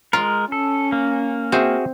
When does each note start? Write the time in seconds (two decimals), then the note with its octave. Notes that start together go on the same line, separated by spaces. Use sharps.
0.13 G#3 F4 A#4
0.52 C#4 A4
0.92 A#3
1.52 C4 F#4 G#4 E5